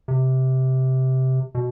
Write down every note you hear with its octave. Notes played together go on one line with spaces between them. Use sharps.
C3
B2